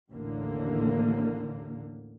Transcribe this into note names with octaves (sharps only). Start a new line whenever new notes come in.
A1 D#2 A2 D3 A#3